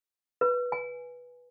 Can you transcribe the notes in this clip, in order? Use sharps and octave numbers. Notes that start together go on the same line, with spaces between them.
B4
G#5